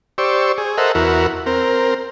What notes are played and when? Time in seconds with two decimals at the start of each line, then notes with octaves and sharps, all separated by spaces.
0.18 G4 C5 D5 C#6 E6
0.58 G#4
0.78 A4 A#4 C5 D#5 E5 F#5
0.95 E2 E4 F#4 A#4
1.46 C4 A#4